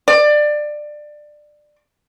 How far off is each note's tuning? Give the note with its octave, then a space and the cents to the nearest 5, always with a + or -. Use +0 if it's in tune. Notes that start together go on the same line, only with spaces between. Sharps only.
D5 +20